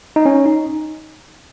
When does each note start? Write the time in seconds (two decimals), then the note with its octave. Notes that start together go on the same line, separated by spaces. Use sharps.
0.16 D#4
0.26 C#4
0.46 D#4